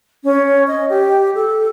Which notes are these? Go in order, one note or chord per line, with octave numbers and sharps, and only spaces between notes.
C#4
D#5
G4
A4